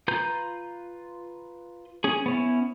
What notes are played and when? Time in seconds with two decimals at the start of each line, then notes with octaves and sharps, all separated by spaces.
0.08 F4 B4 A#5 G6
2.04 C#4 G#4
2.26 B3 C#4 E4